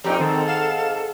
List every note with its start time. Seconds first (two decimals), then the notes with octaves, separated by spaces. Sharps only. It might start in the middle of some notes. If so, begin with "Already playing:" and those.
0.04 F2 A#2 D#4 G4 G5 A#5
0.19 G#2 D#3 C4 A4
0.47 F5 F#5 E7